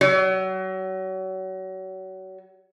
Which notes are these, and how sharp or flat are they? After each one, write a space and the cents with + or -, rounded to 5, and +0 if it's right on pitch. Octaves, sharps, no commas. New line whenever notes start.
F#3 +30